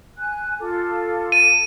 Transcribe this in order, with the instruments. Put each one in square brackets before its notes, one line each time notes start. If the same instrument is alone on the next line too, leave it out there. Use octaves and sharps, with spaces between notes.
[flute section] G#5 F#6
F4 A4 D6
[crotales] D#7